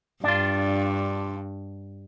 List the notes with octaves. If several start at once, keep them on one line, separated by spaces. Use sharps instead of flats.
G2 D4 F4